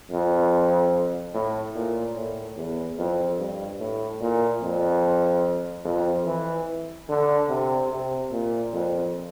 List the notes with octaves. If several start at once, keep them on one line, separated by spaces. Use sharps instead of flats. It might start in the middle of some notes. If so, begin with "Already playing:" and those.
F2
A2
A#2
A2
E2
F2
G2
A2
A#2
F2
F2
E3
D3
C3
C3
A#2
F2